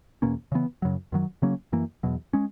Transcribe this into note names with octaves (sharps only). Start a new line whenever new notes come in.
E2 B2 A#3 C#4
C#3 E3 B3
F#2 C#3 F#3
F#2 D#3 F#3
C#3 F#3 A#3 C#4
F#2 E3 A#3
E2 B2 F#3
G#3 C#4